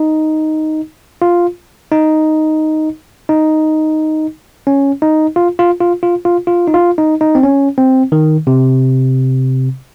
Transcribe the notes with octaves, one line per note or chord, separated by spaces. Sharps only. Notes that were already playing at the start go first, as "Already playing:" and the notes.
Already playing: D#4
F4
D#4
D#4
C#4
D#4
F4
F4
F4
F4
F4
F4
D#4
F4
D#4
D#4
C4
C#4
C4
D#3
C3